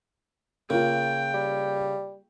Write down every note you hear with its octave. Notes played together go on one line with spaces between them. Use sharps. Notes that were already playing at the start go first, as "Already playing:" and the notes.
C#3 A#3 F4 G5
G3